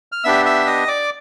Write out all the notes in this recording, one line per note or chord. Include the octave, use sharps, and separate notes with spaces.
F6
B3 D4 G4 E5 E6
E5 E6
D#5 D#6
D5 D6